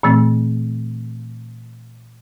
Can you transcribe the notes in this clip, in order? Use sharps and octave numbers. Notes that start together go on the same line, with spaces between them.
A#2 E3 A3 C4